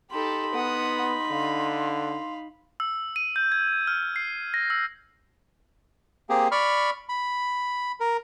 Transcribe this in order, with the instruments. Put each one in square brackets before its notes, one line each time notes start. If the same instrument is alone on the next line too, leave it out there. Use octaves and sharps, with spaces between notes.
[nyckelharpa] D#4 B5 [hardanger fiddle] G4 A4 [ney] C6
[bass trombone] B3 [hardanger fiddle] F#5 D#6
[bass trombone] D3 [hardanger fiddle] F5
[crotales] E6
D#7
G6
G#6
F6
C7
A#6
E6
[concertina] A#3 C4 G4 G#4
D5 B5 C#6 F6
B5
A#4